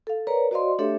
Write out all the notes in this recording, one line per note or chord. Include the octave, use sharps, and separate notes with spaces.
A4 F5
A#4 B4 C#5 D5 A#5
F#4 C5 D5 D#5 F5 C6
A3 D4 G4 A4 C#5 E5